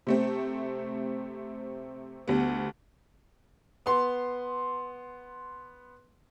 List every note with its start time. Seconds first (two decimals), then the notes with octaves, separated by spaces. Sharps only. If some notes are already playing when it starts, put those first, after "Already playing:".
0.07 C3 A3 C4
2.28 D2 G3 B3
3.86 B3 C6